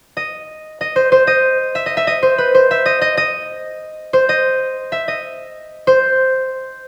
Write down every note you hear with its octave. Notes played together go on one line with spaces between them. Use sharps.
D#5
D#5
C5
C5
D#5
E5
D#5
E5
D#5
C5
B4
C5
E5
D#5
D#5
D#5
C5
D#5
E5
D#5
C5